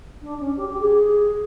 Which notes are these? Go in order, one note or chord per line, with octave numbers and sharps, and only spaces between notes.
D4
C#4
G4
G4
G#4